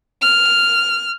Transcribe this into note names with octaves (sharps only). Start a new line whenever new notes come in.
F6